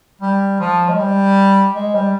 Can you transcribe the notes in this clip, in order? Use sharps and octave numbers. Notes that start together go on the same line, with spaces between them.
G3
F3
G#3
G3
G#3
G3